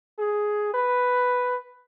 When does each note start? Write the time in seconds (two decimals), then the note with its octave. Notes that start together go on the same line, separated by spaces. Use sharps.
0.19 G#4
0.74 B4